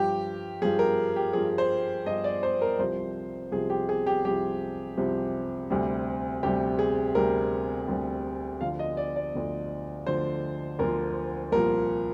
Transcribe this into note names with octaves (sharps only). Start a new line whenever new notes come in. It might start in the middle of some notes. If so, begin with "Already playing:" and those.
Already playing: G2 F3 G4
G2 F3 G#4
A#4
G4
G2 F3 G#4
C5
G2 F3 D#5
D5
C5
A#4
C2 C3 F3 C5
C2 C3 F3 G#4
G4
G#4
G4
C2 C3 F3 G4
C2 C3 F3
D2 C3 G3
D2 C3 G3 G4
G#4
D2 C3 G3 A#4
D2 C3 G3
D2 D3 F3 F5
D#5
D5
D5
D2 D3 F3
D2 D3 F3 C5
D2 D3 F3 A#4
C2 A#2 F3 A#4